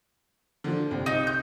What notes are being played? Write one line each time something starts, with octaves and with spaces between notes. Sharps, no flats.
D3 F3
C2
D#4
G6